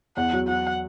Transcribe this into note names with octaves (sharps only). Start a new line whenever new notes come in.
E2 F#5
F#3
F#3 F#5